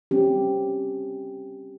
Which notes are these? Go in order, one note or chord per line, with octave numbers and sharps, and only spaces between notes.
G3 C4 C#4 G4